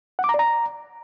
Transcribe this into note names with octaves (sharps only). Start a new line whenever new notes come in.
F#5
D6
A#5
D5
A#5